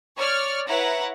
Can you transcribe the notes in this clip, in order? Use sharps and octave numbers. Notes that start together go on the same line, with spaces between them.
C#5 D5 C#6 F6
E4 B4 C#5 F#5 A#5